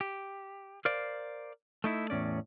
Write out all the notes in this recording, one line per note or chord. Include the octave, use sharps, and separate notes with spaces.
G4
A#4 C5 D5 F5
A3 D#4 E4
E2 A2 C3 C#4 D5